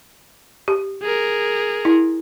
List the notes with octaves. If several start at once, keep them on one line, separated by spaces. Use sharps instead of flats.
G4
G#4 A#4
E4